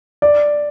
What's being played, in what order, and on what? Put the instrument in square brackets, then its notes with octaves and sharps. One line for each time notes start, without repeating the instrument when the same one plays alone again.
[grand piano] D5